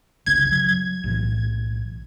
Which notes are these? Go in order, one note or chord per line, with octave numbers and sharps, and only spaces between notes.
F#1 C2 C#3 G#6
F#3
B1 A2 E3